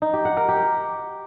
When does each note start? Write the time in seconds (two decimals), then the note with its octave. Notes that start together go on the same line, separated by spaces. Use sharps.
0.02 D#4
0.13 G4
0.25 F#5
0.37 A#4
0.48 G4